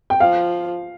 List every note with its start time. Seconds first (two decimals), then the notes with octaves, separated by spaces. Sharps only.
0.10 G5
0.20 F3 F5